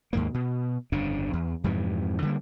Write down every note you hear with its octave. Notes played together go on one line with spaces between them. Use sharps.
D#2 G#2 A#3
B2
G1 F2 C#3 D4
E2
F2 G#2 C3 E3
D3 G3 A#3